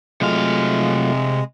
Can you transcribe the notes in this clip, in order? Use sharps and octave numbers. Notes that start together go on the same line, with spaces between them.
C3 F#3 G#3 A3 F4 F5